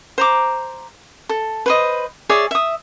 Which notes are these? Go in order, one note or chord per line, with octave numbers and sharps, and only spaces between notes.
C5 A#5 D6
A4
B4 C5 D#5
G#4 C#5 D5 E5
E5 D#6